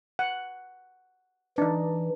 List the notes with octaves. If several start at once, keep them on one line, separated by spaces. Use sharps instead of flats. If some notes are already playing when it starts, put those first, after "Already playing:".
F#5
E3 D4 D#4